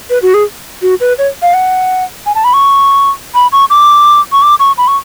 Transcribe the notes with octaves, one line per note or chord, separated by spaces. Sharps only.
B4
F#4
G#4
F#4
B4
C#5
F5
F#5
G#5
A5
B5
C#6
B5
C#6
D6
C#6
D6
C#6
B5
C#6